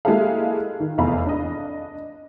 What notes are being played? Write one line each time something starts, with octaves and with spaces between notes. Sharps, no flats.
G#3 A#3 E4 G4 A4 F5
D#3
F1 E2 F5 B5
D4 D#5